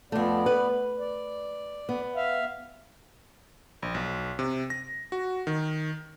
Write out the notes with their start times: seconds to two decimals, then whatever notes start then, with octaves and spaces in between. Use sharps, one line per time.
0.12 F2 A3 B3 D5
0.46 B4
0.99 D5
1.89 B3
2.16 E5 F5
3.82 A#1
3.94 B1
4.39 C3
4.70 A#6
5.12 F#4
5.47 D#3